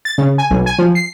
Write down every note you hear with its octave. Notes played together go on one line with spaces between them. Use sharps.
A6
C#3
G#5
B1
G#5
F3
C7